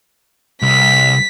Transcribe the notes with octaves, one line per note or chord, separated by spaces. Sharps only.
C2 B6